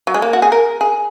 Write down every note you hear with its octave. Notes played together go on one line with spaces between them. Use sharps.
F#3
G#3
A#3
F#4
G#4
A#4
G#4